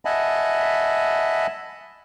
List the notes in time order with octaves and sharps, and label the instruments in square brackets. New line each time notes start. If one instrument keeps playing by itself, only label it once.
[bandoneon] D#5 E5 F#5 G#5 A5 B5